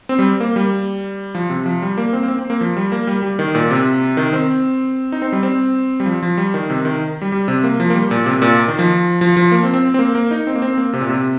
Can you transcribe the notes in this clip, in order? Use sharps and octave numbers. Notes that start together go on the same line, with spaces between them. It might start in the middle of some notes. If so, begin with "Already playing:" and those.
C4
G3
A#3
G3
F3
C3
F3
G3
A#3
C4
A#3
C4
C4
A#3
F3
G3
A#3
G3
G3
D#3
A#2
C3
D#3
C4
D#4
C4
G3
C4
G3
F3
F3
G3
D#3
C3
D#3
G3
G3
C3
A#3
F3
A#3
G3
A#2
C3
A#2
D#3
F3
F3
F3
A#3
C4
C4
C4
A#3
A#3
D#4
C4
A#3
C4
A#3
C3
A#2
C3